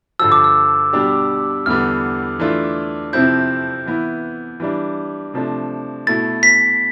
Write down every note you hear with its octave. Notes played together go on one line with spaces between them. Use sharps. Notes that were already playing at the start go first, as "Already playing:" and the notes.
G2 D3 F3 E6
D6
E6
B2 G3 D4 G4
E2 D3 G3 B3 F6
E3 A3 D4 F4
F2 C3 F3 C4 E4 G6
E3 B3 E4
E3 G3 D4
C3 F3 A3 D4
B2 A3 E4 A6
B6